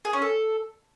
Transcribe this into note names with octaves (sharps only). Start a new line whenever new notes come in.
G#4
C#4
A4